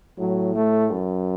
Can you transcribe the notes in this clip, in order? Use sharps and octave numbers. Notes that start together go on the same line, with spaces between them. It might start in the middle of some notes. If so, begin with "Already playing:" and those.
A2 F#3
A3
F#2